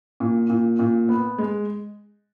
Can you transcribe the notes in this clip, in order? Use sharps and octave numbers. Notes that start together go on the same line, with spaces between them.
A#2
A#2
A#2
B3
G#3